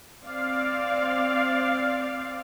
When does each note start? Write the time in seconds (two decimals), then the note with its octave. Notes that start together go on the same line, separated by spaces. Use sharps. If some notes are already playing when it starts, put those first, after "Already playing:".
0.24 C4 D5 F5